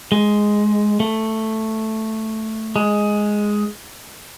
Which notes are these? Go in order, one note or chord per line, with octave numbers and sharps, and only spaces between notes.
G#3
A3
G#3